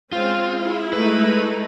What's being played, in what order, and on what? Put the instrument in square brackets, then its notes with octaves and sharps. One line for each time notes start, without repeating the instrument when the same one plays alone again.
[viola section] G#3 C4 C#4 [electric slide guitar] F4
[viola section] E4 G#4
[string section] G#3 A3 D#4 [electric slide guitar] B4